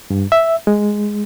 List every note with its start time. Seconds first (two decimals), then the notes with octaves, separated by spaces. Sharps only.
0.10 G2
0.32 E5
0.67 G#3